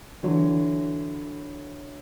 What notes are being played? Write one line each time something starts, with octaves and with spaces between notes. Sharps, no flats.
D3 E3 F#3